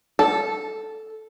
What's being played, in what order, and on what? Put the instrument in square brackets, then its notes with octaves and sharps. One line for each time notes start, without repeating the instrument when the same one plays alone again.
[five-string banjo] A4